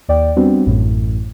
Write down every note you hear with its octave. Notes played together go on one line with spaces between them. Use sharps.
D#2 D5 G5
G3 B3 C4 D4 F#4
A1 F#2 A2